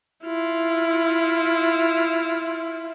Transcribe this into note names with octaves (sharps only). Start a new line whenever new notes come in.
E4 F4